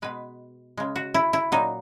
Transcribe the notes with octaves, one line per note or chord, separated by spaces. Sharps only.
B2 G#3 B4
C#3 G#3
F#4
E4
E4
A#2 F#3 D#4